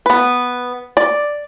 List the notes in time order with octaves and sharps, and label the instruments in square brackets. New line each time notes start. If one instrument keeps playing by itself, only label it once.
[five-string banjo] B3 B4
D5